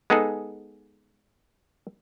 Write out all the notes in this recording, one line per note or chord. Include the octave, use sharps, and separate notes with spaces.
G#3 B3 D#4 G#4 A4